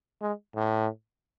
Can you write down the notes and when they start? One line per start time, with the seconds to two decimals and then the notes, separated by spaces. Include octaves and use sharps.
0.22 G#3
0.56 A2